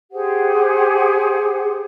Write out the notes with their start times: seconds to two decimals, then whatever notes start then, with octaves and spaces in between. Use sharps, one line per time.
0.11 G4 G#4 C5 F#5